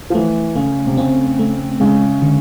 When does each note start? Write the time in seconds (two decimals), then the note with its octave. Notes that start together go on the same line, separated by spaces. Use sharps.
0.10 F3
0.15 E3 A3
0.55 C#3 A3
0.87 C3
0.97 C#3 C4
1.39 A3
1.80 C#3 G#3
2.22 D3